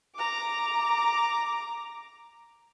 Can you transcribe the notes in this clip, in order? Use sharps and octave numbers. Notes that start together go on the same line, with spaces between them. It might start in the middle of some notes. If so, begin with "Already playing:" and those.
A#5 D6